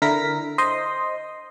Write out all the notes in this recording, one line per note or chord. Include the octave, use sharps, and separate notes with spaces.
D3 E4 A#4 A#6 B6
C5 D#5 C6